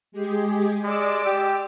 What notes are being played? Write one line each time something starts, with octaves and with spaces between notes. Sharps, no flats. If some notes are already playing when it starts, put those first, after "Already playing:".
G#3 G4 G#4
G#3 D5 D6 E6
G4